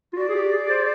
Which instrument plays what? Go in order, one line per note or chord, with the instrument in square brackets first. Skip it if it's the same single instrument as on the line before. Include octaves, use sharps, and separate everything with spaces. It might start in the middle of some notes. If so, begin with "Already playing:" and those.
[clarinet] F4
[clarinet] F#4 [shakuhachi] D5
[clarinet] G#4
G4
G#4
C5